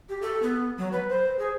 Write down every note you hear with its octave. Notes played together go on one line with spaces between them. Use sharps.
G4
A4
B3
F#3
B4
C5
G#4